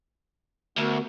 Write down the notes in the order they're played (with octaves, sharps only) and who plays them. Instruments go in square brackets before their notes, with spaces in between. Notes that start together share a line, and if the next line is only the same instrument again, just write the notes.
[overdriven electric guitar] D2 [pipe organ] B3 F#4 A#4